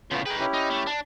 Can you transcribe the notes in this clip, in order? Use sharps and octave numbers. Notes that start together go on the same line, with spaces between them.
A2 C#3 B3 F4
D#4 G#4 B4 G5
C#4 E4 G4
D#4
A3
D4